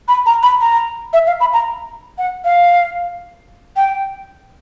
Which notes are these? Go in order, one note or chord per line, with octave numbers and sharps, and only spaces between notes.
B5
A#5
B5
A#5
E5
F5
B5
A#5
F#5
F5
G5